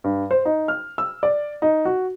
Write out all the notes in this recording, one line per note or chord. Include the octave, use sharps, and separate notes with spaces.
G2
C5
D#4
F6
E6
D5
D#4
F#4